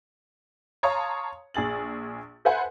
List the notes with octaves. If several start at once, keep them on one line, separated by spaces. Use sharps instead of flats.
C#5 F5 A5 A#5 C6 D#6
A#1 G#4 A6 F#7
A4 B4 C5 E5 F#5 G#5